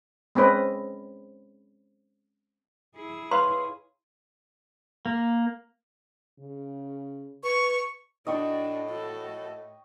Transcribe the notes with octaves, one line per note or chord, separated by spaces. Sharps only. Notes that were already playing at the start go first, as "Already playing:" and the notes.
G#3 C4 C#4 B4 D#5
E4 G#4
B4 C#5 F5 C6
A#3
C#3
B4 C#6
A2 D4 F#4 D#5 G5 C#6
F#4 A4